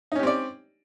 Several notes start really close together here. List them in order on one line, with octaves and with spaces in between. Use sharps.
D#4 C#4 G4 C4 D5